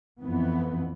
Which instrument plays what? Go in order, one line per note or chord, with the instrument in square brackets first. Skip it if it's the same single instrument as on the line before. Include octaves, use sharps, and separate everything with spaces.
[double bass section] F2 E3 B3